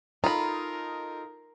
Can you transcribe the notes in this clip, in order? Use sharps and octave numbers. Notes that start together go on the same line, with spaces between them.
D#4 F4 A4 A#4 A#5 B5 D#6